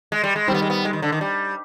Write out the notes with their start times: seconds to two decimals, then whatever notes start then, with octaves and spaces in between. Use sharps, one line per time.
0.12 G#3
0.24 G3
0.36 G#3
0.48 D#3 G3 C4
0.54 B3
0.62 G#3
0.70 B3
0.85 G#3
0.93 D#3
1.02 D3
1.12 D#3
1.21 G3